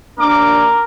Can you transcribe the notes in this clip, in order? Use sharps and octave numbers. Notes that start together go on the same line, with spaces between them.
D#2 A#3 D4 A#4 D6